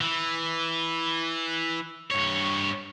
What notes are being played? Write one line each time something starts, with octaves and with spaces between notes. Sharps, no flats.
E3
G2 C#5